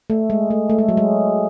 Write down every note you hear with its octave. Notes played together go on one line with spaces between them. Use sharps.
A3
G#3
A3
A3
G#3
F#3
G#3